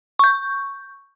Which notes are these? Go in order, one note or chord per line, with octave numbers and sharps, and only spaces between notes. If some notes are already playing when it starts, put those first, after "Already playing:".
C#6 G6